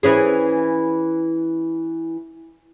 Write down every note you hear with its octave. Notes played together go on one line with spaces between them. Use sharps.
E3 C#4 G#4